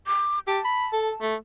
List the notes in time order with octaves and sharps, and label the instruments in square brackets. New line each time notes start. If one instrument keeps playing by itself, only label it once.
[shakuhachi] D6
[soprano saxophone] G4 [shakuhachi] A5
[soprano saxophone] B5
A4
A3